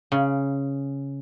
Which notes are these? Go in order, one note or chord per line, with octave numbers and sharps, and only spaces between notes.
C#3